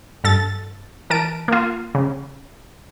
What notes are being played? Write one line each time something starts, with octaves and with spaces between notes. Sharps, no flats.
G2 A4 A6
E3 A#4 A5 D7
A#3 F4
C#3